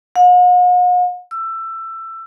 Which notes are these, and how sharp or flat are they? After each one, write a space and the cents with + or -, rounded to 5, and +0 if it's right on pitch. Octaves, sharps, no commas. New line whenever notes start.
F#5 -45
E6 +20